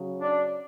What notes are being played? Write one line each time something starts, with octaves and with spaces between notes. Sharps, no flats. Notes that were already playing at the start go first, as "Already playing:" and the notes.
Already playing: C#3 F#3
D4